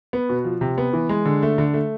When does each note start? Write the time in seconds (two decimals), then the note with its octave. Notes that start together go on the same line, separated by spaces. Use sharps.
0.13 B3
0.29 B2
0.44 F3
0.61 C3
0.78 B3
0.93 E3
1.09 G#3
1.25 D3
1.43 A3
1.58 D3
1.74 A3